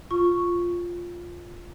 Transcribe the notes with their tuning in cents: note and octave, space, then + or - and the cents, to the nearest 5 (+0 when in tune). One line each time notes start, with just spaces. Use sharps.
F4 +0 C#6 +0